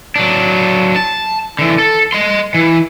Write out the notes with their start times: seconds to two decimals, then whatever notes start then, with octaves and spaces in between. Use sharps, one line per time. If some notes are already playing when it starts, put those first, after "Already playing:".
0.16 F#3 D4
0.96 A5
1.59 D3 E3
1.78 A4
2.13 D#5 C6
2.55 E3